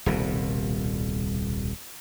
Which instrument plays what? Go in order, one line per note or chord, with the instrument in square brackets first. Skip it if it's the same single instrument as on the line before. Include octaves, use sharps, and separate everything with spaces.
[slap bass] D#1 C2 B2